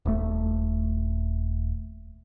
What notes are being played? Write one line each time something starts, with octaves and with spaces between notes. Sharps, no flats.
D#1 A3